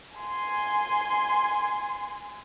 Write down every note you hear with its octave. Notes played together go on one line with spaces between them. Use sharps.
G#5 C6